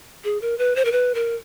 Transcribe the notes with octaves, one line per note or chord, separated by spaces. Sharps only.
G#4
A#4
B4
C5
A#4
B4
A#4